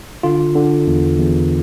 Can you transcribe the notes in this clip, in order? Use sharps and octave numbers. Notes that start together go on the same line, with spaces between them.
D3 F4
D3
E2
E2